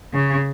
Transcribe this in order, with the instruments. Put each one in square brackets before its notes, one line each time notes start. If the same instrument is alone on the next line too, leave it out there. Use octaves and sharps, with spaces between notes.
[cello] C#3